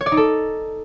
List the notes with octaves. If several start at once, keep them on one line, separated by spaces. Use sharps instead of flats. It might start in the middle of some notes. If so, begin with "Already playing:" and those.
C#5
D5
D#4
A4